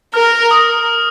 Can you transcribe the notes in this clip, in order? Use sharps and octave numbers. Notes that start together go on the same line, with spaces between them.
A#4 F6
D#6